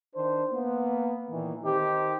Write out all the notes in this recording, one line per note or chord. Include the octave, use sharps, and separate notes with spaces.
D#3 D4 C5
A#3 B3
A#2 D#3 E3
D#3 C4 D#4 G4